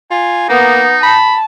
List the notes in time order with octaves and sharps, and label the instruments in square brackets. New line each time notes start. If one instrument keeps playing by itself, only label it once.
[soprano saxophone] F4 [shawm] G#5
[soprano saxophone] A#3 [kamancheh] B3 [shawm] D#4
[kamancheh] A5 [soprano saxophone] B5